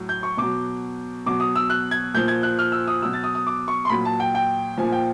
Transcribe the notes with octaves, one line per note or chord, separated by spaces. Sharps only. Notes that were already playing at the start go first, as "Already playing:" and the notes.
Already playing: A2 F#3
G6
C#6
B2 F#3 D6
B2 F#3 D6
D#6
E6
F#6
G#6
A#2 F3 G6
G#6
F#6
F6
E6
D#6
B2 F#3 E6
A6
D#6
D#6
D6
C#6
C6
A#2 F#3 B5
A5
G5
G5
A#2 F3 G#5
G5